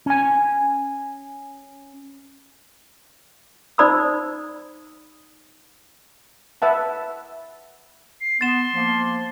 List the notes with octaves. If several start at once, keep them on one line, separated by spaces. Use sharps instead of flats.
C#4 G#5
D#4 C5 D5 B5 D#6 E6
B4 E5 F#5 A5
C7
B3 C6 A6 E7
F3 A#3